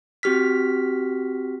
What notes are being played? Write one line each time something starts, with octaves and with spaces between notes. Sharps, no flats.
C4 F#4 G4 F6 B6